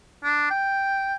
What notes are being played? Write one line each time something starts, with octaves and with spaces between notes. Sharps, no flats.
D4
G5